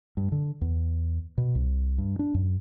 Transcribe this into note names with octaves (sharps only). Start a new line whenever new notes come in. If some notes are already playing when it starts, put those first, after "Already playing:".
G2
D3
E2
B2
C2
G2
D4
F#2